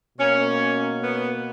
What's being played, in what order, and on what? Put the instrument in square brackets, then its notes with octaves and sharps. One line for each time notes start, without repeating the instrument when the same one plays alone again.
[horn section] B2 A#3 C#4
B3